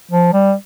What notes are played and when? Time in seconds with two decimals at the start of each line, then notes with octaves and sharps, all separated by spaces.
0.11 F3
0.33 G3